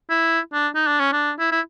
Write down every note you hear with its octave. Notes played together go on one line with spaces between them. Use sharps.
E4
D4
D#4
D4
C#4
D4
E4
E4